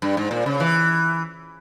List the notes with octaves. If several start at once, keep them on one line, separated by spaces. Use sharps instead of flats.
G2
G#2
A#2
C#3
E3